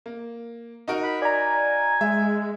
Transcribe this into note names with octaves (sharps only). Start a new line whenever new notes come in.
A#3
D#4 F#4 A#4
B5
D5 G#5 A#5
G#3 E5